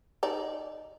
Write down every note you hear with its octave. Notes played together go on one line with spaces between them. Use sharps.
D#4 D5